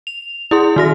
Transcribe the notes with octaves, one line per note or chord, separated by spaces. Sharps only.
F7
E4 G#4 C6
D#3 F#4 A#6